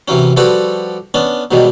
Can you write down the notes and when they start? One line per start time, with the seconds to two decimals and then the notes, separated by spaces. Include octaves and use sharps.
0.08 C3 E3 F#3 C#4
0.37 F3 G3 F#4 G4 A4 B4
1.14 B3 C#4 D4
1.51 G#2 B2 D#3 F#3 G3